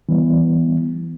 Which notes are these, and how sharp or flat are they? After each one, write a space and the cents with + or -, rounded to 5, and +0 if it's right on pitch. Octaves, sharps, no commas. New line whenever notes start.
E3 +0 G3 +0 B3 +5